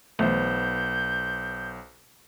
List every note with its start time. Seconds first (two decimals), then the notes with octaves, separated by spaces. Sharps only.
0.19 B1 E3 A3 B3 C5 G6